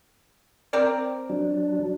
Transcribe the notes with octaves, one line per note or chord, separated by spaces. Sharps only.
C4 A#4 D5
F#3 D4